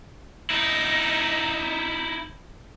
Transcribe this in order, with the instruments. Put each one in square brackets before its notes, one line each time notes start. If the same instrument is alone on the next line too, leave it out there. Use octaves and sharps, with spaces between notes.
[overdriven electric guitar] D#4 E4